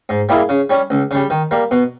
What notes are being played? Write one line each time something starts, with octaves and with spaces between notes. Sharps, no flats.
G#2
G3 A#3 E4 G#4
C#3
G3 C#4
C#2
C#3 G3
D#3
G3 A#3
B2